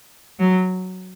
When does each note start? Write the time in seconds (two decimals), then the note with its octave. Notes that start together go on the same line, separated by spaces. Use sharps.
0.39 F#3